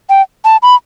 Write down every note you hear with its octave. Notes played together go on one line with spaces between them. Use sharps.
G5
A5
B5